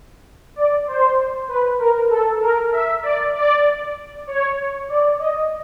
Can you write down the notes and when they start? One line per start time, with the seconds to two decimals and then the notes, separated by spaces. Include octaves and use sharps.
0.56 D5
0.87 C5
1.48 B4
1.79 A#4
2.10 A4
2.42 A#4
2.72 E5
3.03 D5
3.35 D5
4.27 C#5
4.89 D5
5.19 D#5